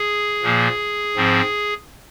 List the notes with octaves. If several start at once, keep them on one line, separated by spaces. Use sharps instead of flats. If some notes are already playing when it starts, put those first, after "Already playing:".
Already playing: G#4
A#2 F3 A#3
G#2 F3 C4